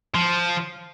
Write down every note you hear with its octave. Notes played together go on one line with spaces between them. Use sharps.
F3